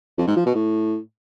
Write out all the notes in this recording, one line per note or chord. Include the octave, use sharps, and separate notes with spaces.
F2
G#2
F3
B2
A2